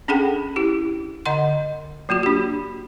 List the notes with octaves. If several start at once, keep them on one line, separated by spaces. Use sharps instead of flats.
C#4 D4 G#4 A4 F#5 G5
E4 G4
D3 D#5 F#5 C6
F#3 A#3 F4 F#4
D4 G4